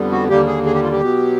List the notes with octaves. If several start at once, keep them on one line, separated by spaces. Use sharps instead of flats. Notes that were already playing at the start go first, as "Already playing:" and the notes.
Already playing: F2 D3 G3 B3
F#4
D#2 D3 G3 A#3 G4
G#4
G#4
G4
F4
G4
B2 F#3 B3